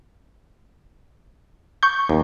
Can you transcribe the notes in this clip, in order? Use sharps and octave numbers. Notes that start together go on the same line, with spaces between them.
C#6 G6
D#2